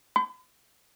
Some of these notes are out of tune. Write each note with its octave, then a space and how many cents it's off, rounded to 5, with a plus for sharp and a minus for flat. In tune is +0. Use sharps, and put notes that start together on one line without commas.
B5 +45